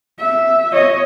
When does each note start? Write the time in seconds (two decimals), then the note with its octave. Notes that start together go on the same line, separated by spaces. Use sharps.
0.20 E5
0.73 C#5 D#5